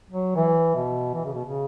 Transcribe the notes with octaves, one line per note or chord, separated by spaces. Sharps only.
F#3
E3
B2
E3
C#3
B2
C#3